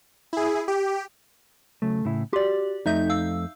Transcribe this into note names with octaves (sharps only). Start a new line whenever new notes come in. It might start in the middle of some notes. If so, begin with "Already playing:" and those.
E4 G#4
G4
C#3 F#3 A3
A2 C#3 E4
F#4 G4 D5 C6
F2 A3 D#4 D#5 E5 G6
F5 E6